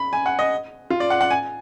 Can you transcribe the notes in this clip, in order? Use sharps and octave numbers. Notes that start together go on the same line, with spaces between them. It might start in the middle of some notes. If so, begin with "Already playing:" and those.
Already playing: B5
G#5
F#5
D#5
F4
D5
F#5
F#5
G#5